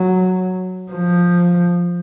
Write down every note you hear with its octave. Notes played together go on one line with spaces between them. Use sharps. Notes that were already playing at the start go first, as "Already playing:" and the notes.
Already playing: F#3
F3